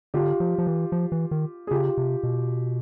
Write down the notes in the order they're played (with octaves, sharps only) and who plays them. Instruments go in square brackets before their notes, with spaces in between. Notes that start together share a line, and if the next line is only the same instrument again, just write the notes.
[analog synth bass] D3 [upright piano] F4 G4
[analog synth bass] F3
F3
E3
F3
E3
D#3
[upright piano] G#4
[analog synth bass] C#3 [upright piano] F4 G4
[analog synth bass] C3
B2